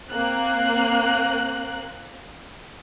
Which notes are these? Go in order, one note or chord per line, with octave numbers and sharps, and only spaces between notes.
A#3 C4 F#6